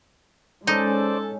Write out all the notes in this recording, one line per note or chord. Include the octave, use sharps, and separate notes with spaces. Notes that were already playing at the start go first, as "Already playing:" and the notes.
G#3 C#4 D#4 A4 C5 D5